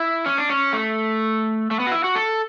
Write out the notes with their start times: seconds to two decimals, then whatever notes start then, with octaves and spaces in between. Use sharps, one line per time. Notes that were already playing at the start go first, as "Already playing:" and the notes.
Already playing: E4
0.26 C#4
0.38 D4
0.50 C#4
0.73 A3
1.71 A3
1.80 B3
1.87 F#4
1.92 E4
2.04 F#4
2.15 A4